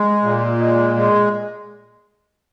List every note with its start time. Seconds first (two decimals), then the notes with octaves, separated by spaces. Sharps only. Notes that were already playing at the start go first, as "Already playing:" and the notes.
Already playing: G#3
0.22 A#2
0.59 G#3
0.96 G#3